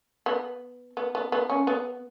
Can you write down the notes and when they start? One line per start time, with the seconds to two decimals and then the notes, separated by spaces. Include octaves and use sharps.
0.26 B3
0.97 B3
1.15 B3
1.32 B3
1.50 C#4
1.67 B3